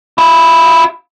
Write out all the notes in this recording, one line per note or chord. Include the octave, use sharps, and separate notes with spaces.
E4 F4